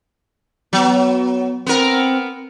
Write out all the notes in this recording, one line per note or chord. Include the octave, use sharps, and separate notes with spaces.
F#3 B3
B3 C4 A#4